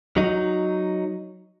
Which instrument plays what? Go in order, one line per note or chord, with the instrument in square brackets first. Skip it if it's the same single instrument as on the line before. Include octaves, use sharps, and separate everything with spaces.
[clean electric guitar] F#3 D#4